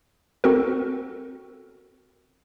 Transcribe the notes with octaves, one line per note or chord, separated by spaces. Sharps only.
C4 F#4 A4 A#4